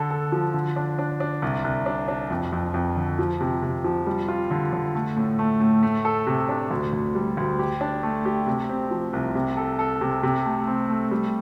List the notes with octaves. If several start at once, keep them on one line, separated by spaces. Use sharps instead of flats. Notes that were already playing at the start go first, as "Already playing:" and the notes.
Already playing: D3 A4
A4
F3
D3
D4
D4
D4
C2
C2
D4
D4
F2
F2
F2
D3
F3
C3
C3
F3
G3
F4
D3
D3
A3
A2
A3
A2
A3
A4
C3
D4
D2
D2
G3
D2
G4
D4
A3
G4
C3
C4
F3
C2
C3
A4
A4
C3
C3
A3
C4
A3
G3